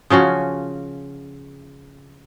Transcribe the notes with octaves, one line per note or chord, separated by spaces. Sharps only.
C#3 F3 C#4 F#4